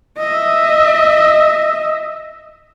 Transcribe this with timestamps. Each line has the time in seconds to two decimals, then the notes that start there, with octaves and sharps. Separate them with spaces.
0.18 D#5 E5